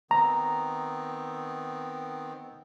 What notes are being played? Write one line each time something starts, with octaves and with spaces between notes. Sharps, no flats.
D#3 B3 C4 A#5